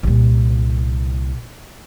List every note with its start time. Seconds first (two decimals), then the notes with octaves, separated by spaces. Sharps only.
0.03 C2 A#2